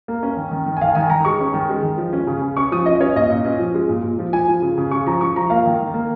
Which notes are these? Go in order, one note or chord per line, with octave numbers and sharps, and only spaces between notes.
A#3
C#4
D#3
D#3
D#3
G#5
D#3 F5
D#3 G#5
D#3 A#5
G#3 C#6
C#4
D#3
G#3
D#3
F3
C#4
C#3
C#3
C#4 C#6
F3 D#6
C#4 D#5
C#4 C#5
A#2 D#5
A#2
C#4
F3
G#3
A#2
A#2
F3
F3 G#5
F3
C#3
C#3
C#3 C#6
F3 A#5
F3 C#6
F3 A#5
A#3 F5
D#3
D#3
A#3